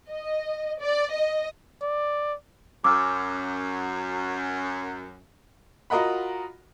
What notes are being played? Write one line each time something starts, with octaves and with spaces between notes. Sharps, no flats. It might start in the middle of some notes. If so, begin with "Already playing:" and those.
D#5
D5
D#5
D5
F#2 D6 E6 F6
F4 F#4 A#4 D#5 F#5 B5